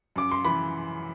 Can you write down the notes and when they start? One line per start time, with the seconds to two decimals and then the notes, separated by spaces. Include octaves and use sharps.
0.16 F#2 D6
0.31 C6
0.45 E3 B5